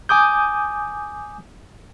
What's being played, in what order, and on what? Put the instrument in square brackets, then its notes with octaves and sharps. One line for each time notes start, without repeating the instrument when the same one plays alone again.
[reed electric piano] G#5 D6 D#6 G6